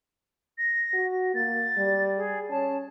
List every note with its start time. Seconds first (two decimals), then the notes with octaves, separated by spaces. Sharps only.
0.58 A#6
0.94 F#4
1.35 A#3 A6
1.77 G3
2.17 G#4
2.50 C#4 A5